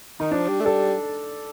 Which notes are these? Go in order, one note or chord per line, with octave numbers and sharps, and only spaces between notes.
D#3 D#4
F3 D4
G3
A3
G3 A4